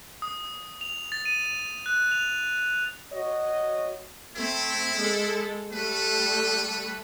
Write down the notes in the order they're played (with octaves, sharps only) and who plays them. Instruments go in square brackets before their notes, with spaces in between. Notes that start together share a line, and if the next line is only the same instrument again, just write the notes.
[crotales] D#6
F7
A6
D#7
F#6
F7
[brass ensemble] F#4 C#5 D#5
[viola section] A3 C4 [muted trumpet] E4
[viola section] G#3 A4
[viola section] G3 A3 A4 [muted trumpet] B4